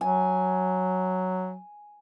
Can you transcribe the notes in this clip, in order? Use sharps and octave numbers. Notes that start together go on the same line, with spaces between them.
F#3 G#5